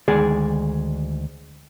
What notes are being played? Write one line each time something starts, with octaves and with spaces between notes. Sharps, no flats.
D2 D#3 G#3 G#4 D5